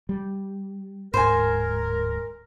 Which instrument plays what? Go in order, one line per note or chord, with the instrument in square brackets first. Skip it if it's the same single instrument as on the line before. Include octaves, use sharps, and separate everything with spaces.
[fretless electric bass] G3
[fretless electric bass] D1 G#2 [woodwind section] A#4 [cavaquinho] C5 G#5